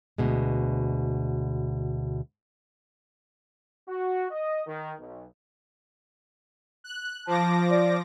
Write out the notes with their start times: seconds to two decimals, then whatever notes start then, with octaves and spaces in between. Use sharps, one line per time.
0.18 D2 B2 G#3
3.88 F#4
4.31 D#5
4.67 D#3
4.99 B1
6.84 F#6
7.27 F3 A5 D6 A#6
7.70 D5